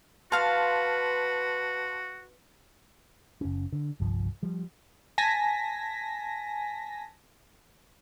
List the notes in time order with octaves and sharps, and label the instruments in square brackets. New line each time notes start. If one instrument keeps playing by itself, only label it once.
[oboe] F#4 [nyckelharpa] B4 [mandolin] F5 F6 [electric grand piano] A5 C6
[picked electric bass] F#1 C#4
D3
G1 C2 G2 F3
F3 G3
[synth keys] G#5 A5 A#6 B6